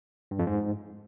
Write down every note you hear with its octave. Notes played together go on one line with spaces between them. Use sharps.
G2
F2
G#2